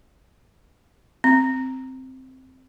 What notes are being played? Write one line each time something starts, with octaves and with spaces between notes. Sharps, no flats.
C4